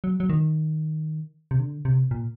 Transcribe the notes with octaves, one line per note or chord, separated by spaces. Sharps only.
F#3
F#3
D#3
C3
D3
C3
A#2